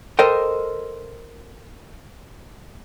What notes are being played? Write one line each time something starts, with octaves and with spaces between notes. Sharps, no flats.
A4 A#4 C5 D#5 G5